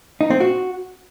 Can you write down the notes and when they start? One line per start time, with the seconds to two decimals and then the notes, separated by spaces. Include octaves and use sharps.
0.21 D#4
0.30 C4
0.40 F#4